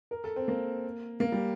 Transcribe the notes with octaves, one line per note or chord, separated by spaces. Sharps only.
A#4
A4
C4
A#3
A#3
G3